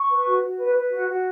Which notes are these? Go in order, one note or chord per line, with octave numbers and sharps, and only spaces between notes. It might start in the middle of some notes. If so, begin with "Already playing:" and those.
Already playing: C#6
B4
F#4
F#4
B4
B4
F#4
F#4